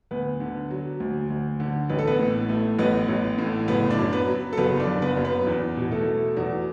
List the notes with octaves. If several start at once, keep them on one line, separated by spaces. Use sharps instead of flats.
D2 B3 B4
D3
F#3
D2
D2
D3
A1 B4
A4
B3 B4
A2
A3
A1 B3 B4
A1
A2
F#1 B3 B4
D4 D5
F#2
B3 B4
F#3
A4
F#1 B3 B4
D4 D5
F#1
B3 B4
F#2
B3 B4
E2 B3 B4
B2
A3 A4
A3
E2 F#3 F#4